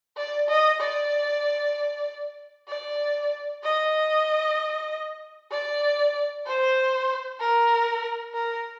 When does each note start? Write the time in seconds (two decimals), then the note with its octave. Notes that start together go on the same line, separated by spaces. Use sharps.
0.17 D5
0.49 D#5
0.80 D5
2.68 D5
3.63 D#5
5.51 D5
6.46 C5
7.40 A#4
8.34 A#4